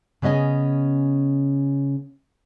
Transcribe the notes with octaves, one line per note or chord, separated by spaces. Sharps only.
C#3 B3 C#4 D#5 G#5